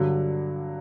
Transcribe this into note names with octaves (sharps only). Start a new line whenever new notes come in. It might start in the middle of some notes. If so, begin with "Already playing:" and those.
Already playing: G2 D3 F#3